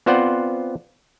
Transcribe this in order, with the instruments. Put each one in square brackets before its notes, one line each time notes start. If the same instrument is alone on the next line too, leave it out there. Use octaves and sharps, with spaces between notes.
[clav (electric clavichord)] B3 C4 F4 C5 D5 F#5